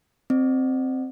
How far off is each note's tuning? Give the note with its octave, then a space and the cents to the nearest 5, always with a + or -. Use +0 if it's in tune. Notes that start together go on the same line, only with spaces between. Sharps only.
C4 +0 D#5 -45